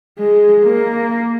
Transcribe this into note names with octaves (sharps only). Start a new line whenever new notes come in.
G#3
A#3